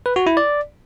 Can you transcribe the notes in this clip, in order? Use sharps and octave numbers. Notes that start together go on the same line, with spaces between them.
B4
F#4
E4
D5